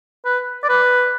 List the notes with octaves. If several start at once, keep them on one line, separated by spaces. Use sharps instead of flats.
B4
D5
B4